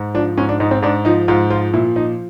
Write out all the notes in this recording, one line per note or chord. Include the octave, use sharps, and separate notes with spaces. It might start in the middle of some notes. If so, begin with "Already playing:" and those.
Already playing: G#2
F3 D4
G#2 C#4
D4
G#2 D#4
C4
G#2 D4
F3 D#4
G#2 F4
F3 F4
A#2 E4
F3 D#4